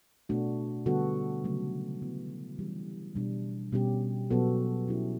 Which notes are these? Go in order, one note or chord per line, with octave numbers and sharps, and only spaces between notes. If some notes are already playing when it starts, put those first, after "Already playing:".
B2 A3 D4 F#4
D3 G3 B3 F#4 A4
C#3 F#3 A3
E3 B3 E4
E3 G3 C#4 G4
B2 G3 D4
B2 G3 C#4 G4
B2 F#3 B3 F#4 A4
F#3 C#4 E4 G4